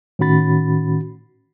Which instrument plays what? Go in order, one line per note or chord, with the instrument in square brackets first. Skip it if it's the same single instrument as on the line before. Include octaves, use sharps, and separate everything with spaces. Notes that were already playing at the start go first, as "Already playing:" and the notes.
[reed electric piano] A2 D#3 C#4 F#4 B5 A6